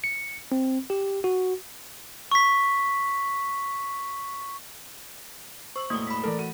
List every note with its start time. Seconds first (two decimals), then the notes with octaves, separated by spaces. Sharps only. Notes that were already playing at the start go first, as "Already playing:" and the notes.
0.04 C#7
0.52 C4
0.90 G4
1.24 F#4
2.31 C#6 B6
5.76 C5 C#6 E6 F#7
5.90 E1 A2 A#3 D#6 G7
6.07 B5 B6
6.24 E3 A3 A4 A#4 D5
6.38 F#4 D#7